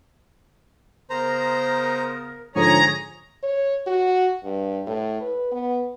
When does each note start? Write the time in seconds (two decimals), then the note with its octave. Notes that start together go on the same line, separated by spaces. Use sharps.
1.10 C#3 B3 A#4 C5 A#5
2.56 G#2 D3 F3 G#4 C#5 G#5 A#5 C#6
3.43 C#5
3.87 F#4
4.43 G2
4.87 A2
5.21 B4
5.52 B3